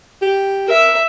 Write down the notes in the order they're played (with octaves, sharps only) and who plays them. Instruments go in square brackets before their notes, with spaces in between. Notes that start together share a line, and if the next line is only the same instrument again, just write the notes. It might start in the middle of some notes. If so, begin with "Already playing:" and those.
[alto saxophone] G4
[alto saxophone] A#4 [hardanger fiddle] E5